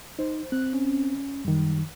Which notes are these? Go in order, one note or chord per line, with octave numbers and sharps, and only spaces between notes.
D#4 C5
C4 F#6
C#4
F#2 D#3 G3